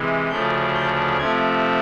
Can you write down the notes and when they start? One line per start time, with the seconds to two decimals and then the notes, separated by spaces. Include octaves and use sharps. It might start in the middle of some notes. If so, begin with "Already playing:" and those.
Already playing: C3 E3 G#3
0.28 D2 C#3 F3 A3 D4 G6
0.74 G6
1.18 C3 F3 A3 C4 G#6